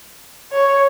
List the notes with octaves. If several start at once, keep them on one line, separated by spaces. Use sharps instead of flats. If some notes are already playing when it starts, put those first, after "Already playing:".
C#5